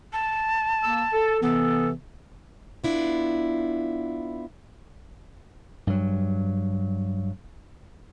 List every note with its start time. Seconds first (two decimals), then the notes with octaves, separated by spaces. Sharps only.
0.13 A5
0.84 A#3 E6
1.13 A4
1.42 C3 E3 B3 A4
2.84 B3 D4 E4 F4
5.87 G2 F#3